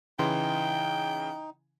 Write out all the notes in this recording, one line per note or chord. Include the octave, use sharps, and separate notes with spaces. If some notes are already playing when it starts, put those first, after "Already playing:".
C#3 E3 D#4 G5 C6